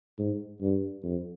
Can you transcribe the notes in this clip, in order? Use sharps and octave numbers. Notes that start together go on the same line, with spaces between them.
G#2
G2
F2